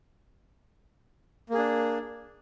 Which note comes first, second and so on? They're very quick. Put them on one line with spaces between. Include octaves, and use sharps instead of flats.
A#3 G#4 D4